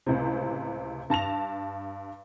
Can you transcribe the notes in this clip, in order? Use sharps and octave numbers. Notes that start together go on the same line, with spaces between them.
C#2 A2 C3
G2 A5 A#6 F7